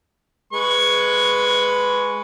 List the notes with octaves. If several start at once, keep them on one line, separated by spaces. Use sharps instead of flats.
G#3 B4 C#6